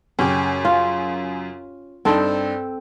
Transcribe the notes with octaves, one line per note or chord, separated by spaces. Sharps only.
F#2 C#3 C#4 G4
F4
G2 C4 D4 D#4 A4